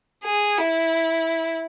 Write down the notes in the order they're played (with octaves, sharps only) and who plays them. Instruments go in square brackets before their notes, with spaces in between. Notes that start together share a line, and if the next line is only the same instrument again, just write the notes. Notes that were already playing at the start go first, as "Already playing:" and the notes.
[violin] G#4
E4